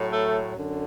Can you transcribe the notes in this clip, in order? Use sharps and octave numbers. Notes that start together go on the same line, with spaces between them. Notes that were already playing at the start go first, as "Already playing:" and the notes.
Already playing: A2 F#3
A3
F#2 D3